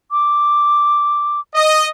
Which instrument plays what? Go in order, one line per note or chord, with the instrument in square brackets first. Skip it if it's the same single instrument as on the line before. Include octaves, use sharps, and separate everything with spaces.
[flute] D6
[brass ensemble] D#5